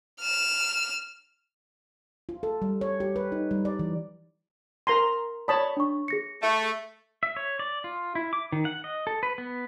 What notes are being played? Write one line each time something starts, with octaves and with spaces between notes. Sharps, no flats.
F6 E7
F4
A4
G3
C#5
G4
B4
D#4
G3
D5
E3
A#4 A#5 C6
C#5 D5 A5 B5 D#6
D4 C#6
G#4 A#6 C#7
A3
E5
C#5
D5
F4
E4
D6
D#3
F#5
D#5
A4
B4
B3